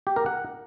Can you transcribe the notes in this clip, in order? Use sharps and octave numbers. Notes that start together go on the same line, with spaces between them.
G4
A#4
F#5